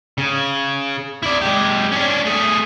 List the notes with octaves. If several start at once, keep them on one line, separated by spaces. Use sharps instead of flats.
C#3
E4 D5
G#3 G4
C#4 D4
A3 G#4